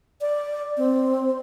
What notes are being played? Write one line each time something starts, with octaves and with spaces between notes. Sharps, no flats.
D5
C4